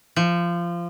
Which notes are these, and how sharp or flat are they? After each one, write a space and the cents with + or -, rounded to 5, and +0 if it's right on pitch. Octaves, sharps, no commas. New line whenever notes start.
F3 -20